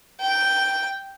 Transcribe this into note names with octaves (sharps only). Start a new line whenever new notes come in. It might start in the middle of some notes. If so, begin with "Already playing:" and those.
G5